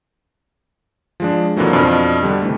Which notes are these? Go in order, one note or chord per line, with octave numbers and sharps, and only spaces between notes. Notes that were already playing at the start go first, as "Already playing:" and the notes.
F3 G#3 D4
F2 D3 E3 F#3 A#3
F2 B2 D4 D5 D#5 F6
D3 G3
C3 E3 A3